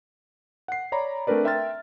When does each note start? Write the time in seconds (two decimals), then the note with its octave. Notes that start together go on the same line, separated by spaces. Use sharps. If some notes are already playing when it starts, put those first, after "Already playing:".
0.68 F#5 C7
0.92 C#5 D5 A#5 B5
1.27 A3 C4 D4 A#4 B4 D5
1.45 A#4 E5 G5 C6 F6 A6